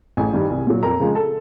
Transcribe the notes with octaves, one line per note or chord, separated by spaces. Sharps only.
A1 G#4 G#5
G2 D#3 G3
C2
A#2 F#3
F2 A#4 A#5
C#3 F3 G#3
A4 A5